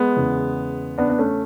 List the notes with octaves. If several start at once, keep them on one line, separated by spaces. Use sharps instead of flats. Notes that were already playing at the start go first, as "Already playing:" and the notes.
Already playing: G#3 B3
E2 C#3 E3
B3 D4
B3
A3 C#4